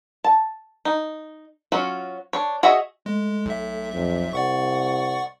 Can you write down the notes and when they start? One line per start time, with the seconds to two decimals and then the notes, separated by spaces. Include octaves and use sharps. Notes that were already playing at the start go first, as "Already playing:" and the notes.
0.24 A5
0.85 D#4
1.72 F#3 C#4 F4 F#4
2.33 D4 C#5
2.63 F#4 G#4 C#5 D#5 E5
3.06 G#3 A3
3.46 B1 E5
3.94 F2
4.33 C2 D5 F#5 C#6